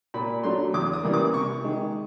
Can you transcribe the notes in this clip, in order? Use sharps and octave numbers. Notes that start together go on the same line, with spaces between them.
A#2 B5
F#3 A3 D4 C6
E2 D6
D#6
C#3 E3 G3 A#3
D6
C3 C#6
D#3 G#3